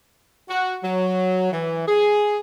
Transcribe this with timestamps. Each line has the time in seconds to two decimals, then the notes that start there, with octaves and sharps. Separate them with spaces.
0.49 F#4
0.83 F#3
1.52 E3
1.87 G#4